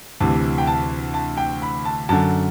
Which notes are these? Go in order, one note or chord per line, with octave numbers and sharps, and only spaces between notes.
D2 C3 E3 A5
G5
A5
A5
G5
B5
A5
F#2 D3 A5